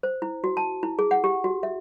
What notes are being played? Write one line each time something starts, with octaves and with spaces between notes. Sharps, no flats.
C5
E4
F#4
A5
E4
G#4
F#5
G4
F#4
E5